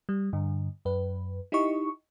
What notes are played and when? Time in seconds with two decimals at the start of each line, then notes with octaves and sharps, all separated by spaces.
0.09 G3
0.33 G2 D3
0.85 F#2 B4
1.52 D#4 E4 G4 D#5 C#6